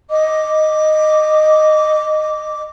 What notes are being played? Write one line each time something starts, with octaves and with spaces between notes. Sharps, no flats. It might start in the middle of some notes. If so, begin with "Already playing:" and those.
D#5 D6